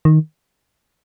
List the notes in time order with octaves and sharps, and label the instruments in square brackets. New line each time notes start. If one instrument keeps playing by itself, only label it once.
[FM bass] D#3